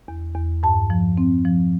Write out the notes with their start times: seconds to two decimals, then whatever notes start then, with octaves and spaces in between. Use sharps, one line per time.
0.08 E2
0.35 E2
0.63 G2 A5
0.90 F3
1.17 C4
1.45 F3